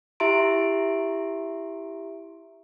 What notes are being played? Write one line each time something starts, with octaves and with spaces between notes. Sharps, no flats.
E4 G4 E5 A#5 C6 D7